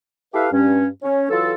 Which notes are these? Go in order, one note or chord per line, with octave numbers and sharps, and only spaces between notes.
E4 G4 A4 B4 E5 F5
G2 C#4
C#4
E3 F#3 F4 A4